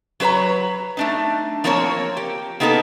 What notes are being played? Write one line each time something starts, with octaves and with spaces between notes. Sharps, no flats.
F#3 F#4 B4 C#5 A#5
A3 D4 D#4
F3 A#3 C4 A#4 B4 C#5
G4
A#3 B3 D#4 G4 A4